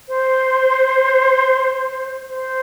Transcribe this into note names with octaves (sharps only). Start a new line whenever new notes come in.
C5
C5